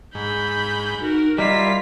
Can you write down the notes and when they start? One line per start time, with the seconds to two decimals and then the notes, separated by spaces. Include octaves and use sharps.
0.15 G#2 B5 G6
1.01 D#4 F#4 A#4
1.38 G3 E4 F4 A#4 D#5 B6